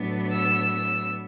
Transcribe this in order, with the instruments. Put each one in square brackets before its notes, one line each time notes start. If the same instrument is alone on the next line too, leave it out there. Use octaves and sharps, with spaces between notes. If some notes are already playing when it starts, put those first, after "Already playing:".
Already playing: [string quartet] A2 F#3 B3 D4
E6
E6